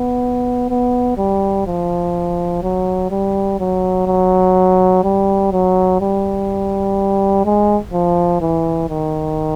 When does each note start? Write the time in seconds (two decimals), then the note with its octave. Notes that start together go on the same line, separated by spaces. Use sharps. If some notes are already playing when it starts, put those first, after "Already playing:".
Already playing: B3
0.70 B3
1.18 G3
1.67 F3
2.63 F#3
3.11 G3
3.60 F#3
4.07 F#3
5.04 G3
5.52 F#3
6.01 G3
7.45 G#3
7.93 F3
8.41 E3
8.89 D#3